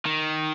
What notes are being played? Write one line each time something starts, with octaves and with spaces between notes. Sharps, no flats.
D#3